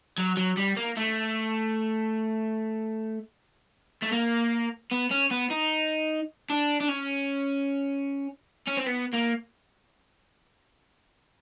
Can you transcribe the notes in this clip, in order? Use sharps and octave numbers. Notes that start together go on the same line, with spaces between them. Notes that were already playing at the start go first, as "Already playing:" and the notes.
F#3
F#3
G3
A#3
A3
A3
A#3
B3
C#4
B3
D#4
D4
D4
C#4
C#4
C4
B3
A#3